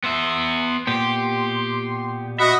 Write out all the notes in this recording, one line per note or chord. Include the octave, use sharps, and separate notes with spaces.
B3 E5 C6
A#2 B3 G4
F#4 D#5 E5 F#5 B5